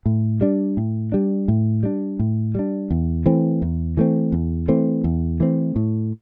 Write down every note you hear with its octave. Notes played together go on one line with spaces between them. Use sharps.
A2
G3 D4
A2
G3 D4
A2
G3 D4
A2
G3 D4
E2
E3 A3 C4
E2
E3 A3 C4
E2
E3 A3 C4
E2
E3 A3 C4
A2